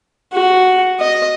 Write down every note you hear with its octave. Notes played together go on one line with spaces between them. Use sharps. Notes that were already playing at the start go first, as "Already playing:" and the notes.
F#4
D#5